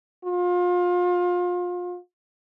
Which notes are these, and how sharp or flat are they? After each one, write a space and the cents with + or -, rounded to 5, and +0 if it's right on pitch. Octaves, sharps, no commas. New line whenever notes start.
F4 +30